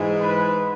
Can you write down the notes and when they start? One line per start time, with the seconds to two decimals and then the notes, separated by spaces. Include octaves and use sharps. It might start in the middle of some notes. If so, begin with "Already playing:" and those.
Already playing: G#2 E3 G#3
0.20 B4